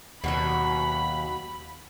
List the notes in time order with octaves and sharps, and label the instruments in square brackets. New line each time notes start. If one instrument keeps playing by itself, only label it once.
[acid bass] D#2 [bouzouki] B2 D3 F#3 [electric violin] B5